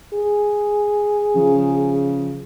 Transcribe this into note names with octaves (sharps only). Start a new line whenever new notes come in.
G#4
C#3 F3